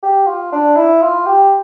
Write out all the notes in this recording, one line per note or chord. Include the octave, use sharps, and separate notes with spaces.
G4
F4
D4
E4
F4
G4